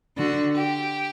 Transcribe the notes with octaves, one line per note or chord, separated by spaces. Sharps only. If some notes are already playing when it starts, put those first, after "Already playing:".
D3 F#4
G4